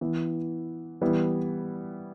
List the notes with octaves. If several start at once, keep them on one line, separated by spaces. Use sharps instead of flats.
E3 B3 E4
E3 G3 B3 E4